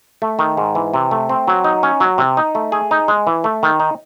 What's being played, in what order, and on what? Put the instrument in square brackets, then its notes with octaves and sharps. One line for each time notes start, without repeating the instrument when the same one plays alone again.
[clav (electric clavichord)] A3
D#3
G#2
E3
C3
A3
C4
F#3
D#4
C#4
F#3
C3
D#4
A3
G#4
D#4
G#3
E3
A3
D#3
D#4